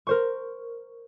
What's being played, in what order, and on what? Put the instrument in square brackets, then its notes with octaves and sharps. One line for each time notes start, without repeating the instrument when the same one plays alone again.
[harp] A#4 C5 C#6